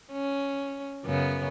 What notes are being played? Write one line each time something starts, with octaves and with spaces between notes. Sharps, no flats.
C#4
F#2 C#3 B3